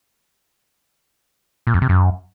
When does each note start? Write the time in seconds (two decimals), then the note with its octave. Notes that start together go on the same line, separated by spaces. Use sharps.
1.67 A#2
1.74 F2
1.82 C3
1.89 F#2